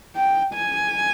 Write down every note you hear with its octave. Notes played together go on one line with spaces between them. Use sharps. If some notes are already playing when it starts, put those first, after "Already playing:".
G5
G#5